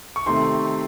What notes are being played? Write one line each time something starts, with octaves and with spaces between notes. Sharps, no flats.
C#6
C3 D#3 A3 C6